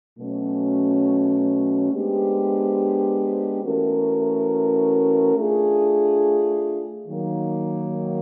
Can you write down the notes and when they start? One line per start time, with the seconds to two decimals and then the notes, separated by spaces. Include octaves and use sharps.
0.19 B2 F#3 A3 C#4
1.91 G#3 B3 D4 G4 C5
3.62 E3 A3 C#4 F#4 A#4
5.35 A3 D4 F4 G#4
7.07 D#3 F#3 A#3